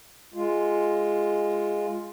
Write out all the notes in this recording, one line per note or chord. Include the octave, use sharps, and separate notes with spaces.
G#3 F4